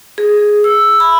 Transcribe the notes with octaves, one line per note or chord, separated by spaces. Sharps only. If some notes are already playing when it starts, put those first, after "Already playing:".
G#4
E6
B5